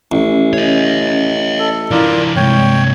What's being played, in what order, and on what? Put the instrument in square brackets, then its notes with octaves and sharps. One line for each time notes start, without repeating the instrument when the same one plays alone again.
[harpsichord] A1 [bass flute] C#4
[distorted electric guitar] C#5 D#5
[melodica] A4
[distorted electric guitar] E3 D4 [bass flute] E4 [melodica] F4 A#4 D5
[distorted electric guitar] G2 C3 [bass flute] G#3 [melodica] C#5 G5